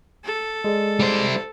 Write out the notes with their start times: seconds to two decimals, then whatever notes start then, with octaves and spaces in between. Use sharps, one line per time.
0.25 A4
0.64 G#3 G#4 D5
1.00 G3 C5